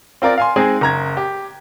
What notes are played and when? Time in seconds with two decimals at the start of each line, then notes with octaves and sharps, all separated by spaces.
0.22 C4 F4 A#4 D5
0.38 F5 G#5 C6
0.56 G#3 C4 D#4 G#4
0.81 F#1 A#5 G#6
1.17 G4